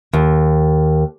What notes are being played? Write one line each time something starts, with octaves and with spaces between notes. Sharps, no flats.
D#2